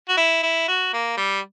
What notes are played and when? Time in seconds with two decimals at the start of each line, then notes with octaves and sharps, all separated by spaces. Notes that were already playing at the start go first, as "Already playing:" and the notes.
0.08 F#4
0.17 E4
0.43 E4
0.68 F#4
0.93 A#3
1.17 G3